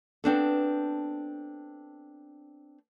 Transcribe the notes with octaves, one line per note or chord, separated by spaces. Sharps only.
B3 C4 D4 A4